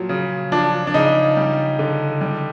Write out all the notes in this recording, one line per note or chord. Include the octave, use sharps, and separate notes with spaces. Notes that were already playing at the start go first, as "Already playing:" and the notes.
Already playing: A#2 F3 F#3
C#3
F3 D4
D4
C#3 D#4
G3
D3
G3